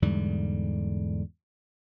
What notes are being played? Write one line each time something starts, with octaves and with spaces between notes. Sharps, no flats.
E2 G#2 D3 G3